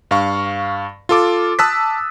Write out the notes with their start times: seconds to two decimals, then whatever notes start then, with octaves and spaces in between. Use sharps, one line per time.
0.11 G2 F5 C#6
1.09 F4 A4 D6
1.59 A5 D#6 E6 F#6 A6 B6